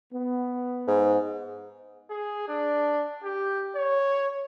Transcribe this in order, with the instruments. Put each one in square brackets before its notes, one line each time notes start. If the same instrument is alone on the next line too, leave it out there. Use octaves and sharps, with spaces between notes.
[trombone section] B3
[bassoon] G#2
[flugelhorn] G#4
D4
G4
C#5